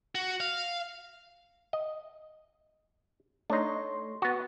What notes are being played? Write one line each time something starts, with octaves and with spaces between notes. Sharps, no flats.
F#4
F5
D#5
A3 D4 D#4 C#5 C6
B3 F#4